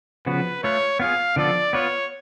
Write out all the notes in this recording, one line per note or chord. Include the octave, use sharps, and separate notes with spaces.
C#3 F3 B3 F#4 B4
A3 F4 B4 C#5
B3 F4 G#4 F5
D3 F3 B3 F4 A4 D5
B3 F4 B4 C#5